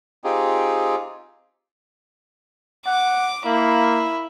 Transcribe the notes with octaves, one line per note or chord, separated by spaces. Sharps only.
C4 D#4 F4 G4 G#4
F#5 D6
A#3 E4